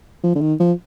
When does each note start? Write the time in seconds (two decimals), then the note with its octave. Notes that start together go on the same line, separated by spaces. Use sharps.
0.24 F3
0.35 D3
0.41 D#3
0.60 F3